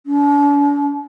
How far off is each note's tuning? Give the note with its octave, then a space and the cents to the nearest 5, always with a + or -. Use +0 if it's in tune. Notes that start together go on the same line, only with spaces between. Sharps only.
D4 -40